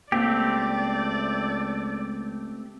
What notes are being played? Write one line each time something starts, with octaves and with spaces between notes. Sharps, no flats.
C#2 A3 A#3 C4 G4 D5